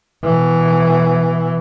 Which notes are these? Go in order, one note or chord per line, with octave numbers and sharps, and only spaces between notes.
B2 E3